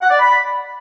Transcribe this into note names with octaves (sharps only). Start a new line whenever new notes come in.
F#5
D5
B5